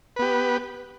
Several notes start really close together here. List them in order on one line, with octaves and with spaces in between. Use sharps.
B4 B3 G4